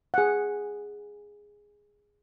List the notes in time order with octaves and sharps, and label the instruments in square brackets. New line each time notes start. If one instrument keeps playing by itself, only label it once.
[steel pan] G#4 F#5